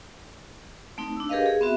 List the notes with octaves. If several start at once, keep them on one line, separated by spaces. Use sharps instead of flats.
A3 C4 D#4
D4 E6
G4 G#4 A#4 B4 D#5 F5
G#4
B3 C4 F#4 E5